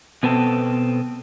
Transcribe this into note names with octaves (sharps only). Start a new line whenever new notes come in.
B2 B3 C4 A4